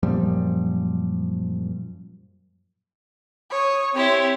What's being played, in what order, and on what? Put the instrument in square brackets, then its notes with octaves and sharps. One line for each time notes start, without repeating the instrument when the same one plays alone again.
[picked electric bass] F#2 A#2 F3 G3
[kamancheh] C#5 D#6
[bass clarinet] C4 [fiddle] E4 G4 [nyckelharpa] C#5 [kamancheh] C6